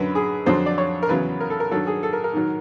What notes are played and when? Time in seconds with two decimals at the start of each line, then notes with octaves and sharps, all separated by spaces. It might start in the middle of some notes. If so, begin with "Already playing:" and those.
Already playing: F#2 D3 F#3 B4
0.15 G#4
0.46 F2 D3 F#3 C5
0.66 D5
0.78 C#5
1.03 A#4
1.09 E2 C#3 F#3 B4
1.40 A#4
1.50 A4
1.60 A#4
1.71 G2 D#3 F#3 A4
1.87 G#4
2.03 A4
2.13 A#4
2.24 A#4
2.33 G#2 D#3 F#3